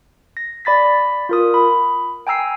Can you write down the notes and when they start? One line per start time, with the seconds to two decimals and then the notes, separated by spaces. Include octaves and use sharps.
0.37 A#6
0.65 D5 B5 A6 B6
1.29 F4 A#4 D#6
1.54 B5
2.27 G5 G#5 A#5 E6 C7